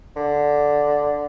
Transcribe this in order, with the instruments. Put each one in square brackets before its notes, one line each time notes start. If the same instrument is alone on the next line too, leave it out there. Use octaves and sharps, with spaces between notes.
[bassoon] D3